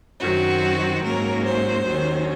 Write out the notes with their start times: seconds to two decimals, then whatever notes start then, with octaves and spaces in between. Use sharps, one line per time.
0.21 F#2 D#3 F#3 C4 F#4
1.03 G#2 F#3 A#3 C#4 A#4
1.45 C5
1.86 D#2 D#3 F#3 C#4